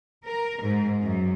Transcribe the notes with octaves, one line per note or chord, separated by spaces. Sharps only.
A#4
G#2
F#2